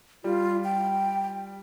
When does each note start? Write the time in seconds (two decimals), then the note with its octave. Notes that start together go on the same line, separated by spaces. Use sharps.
0.24 G3 F4
0.64 G5